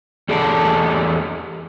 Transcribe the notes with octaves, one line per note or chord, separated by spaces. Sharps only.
E2 G3 G#4 A4 D5 A5